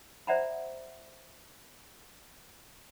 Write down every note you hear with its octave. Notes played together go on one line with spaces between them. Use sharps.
C5 D5 E5 F#5 A#5 B5